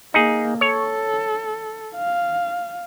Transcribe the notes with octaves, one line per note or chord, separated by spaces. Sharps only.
A#3 D#4 G#4
A4 C#5
F5